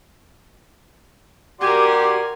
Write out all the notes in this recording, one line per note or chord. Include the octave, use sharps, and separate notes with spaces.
F#4 G4 A#4 D5 G#5 C6